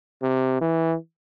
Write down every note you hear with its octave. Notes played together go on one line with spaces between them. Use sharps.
C3
E3